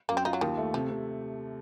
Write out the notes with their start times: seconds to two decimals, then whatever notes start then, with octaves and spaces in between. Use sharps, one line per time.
0.09 F#2 A#3
0.17 C4
0.25 D#4 F4
0.33 F#3
0.41 D#2 D#3
0.57 A3
0.74 C3 F3
0.90 C3